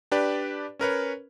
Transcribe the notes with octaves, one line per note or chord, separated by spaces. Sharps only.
D4 G4 B4 D5
C#4 A#4 B4 C#5